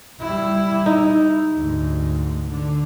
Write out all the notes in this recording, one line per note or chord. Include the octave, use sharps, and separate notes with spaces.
G3 E4
D#4
D2 G#2
D3